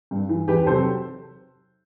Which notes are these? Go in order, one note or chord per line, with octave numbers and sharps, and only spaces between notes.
G2
E3
E2 G4 B4
C3 F#3 A4 C5